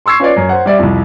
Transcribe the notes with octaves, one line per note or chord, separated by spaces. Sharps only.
C6 C#6 E6 G#6 C7
C#4 F4 B4 C#5 D5
F#2
C5 F#5
G3 D5 E5
C2 F2